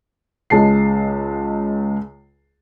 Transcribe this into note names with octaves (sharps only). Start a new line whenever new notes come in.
C#2 G#3 A5 C7